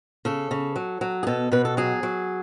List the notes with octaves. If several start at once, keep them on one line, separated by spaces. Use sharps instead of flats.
C#3 A4
C#3
F#3
F#3
G#4
B2 A4
B2 B4
A4
F#3 G#4
F#3